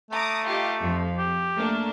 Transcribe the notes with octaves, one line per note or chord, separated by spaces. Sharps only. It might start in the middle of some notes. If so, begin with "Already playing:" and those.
A3 A#5 D6 D#6
D#4 F4 G4
F2 F3
G4
A3 A#3 D4